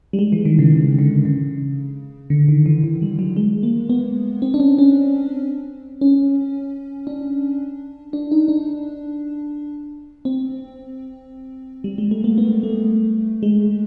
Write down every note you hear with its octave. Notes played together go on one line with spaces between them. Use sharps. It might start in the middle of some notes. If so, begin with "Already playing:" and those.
G3
G#3
E3
D#3
C#3
C#3
D3
C#3
D3
D#3
E3
E3
G3
F#3
G#3
A#3
B3
C4
D4
C#4
C#4
C#4
D4
D4
D#4
D4
C4
G3
G#3
A3
A#3
B3
A3
G#3